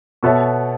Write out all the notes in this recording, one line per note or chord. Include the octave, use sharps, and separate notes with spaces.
B2 B3 A4 C#5 E5